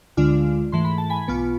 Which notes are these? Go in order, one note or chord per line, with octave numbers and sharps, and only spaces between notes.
D2 D3 G#3 D4 F4
G#2 E3 A3 C6
B5
A5
G#5 B5
B1 B2 B3 F4